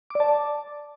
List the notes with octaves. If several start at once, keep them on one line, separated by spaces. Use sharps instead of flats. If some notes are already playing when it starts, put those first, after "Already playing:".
D5 A5 D6